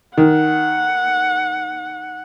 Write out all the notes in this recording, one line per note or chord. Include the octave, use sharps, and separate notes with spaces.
D#3 F#5